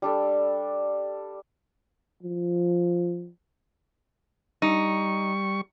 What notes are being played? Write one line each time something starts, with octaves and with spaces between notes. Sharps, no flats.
G3 D4 A4
F3
G3 D#4 C#6